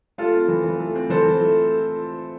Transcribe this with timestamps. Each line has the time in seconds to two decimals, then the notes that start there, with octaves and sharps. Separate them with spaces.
0.18 A3 F4 A4
0.34 C4
0.48 E3
0.64 E3
0.79 A3
0.95 C4
1.10 E3 A4 C5
1.26 E3
1.41 A3